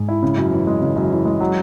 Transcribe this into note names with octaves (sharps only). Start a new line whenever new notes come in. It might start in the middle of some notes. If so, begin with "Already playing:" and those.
Already playing: G#2
E4
C#3
F#2
E3
G#3
C#3
F#2
E3
G#3
F#3